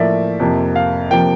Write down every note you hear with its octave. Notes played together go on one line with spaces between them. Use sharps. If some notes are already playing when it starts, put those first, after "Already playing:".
Already playing: A2 F3 A#3 D5 E5
F2 C3 F3 A#3
F5
C3 F3 A#3 G5